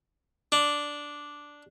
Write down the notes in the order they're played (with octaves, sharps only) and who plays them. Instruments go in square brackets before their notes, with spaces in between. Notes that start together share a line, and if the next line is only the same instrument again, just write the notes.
[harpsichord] D4